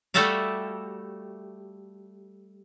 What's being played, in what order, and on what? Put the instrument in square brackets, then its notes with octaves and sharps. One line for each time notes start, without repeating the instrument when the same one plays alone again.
[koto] G3 A3 F#4 A4 E5 F5